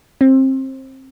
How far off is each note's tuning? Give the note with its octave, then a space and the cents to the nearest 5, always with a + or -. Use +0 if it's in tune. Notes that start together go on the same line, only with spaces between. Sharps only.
C4 +25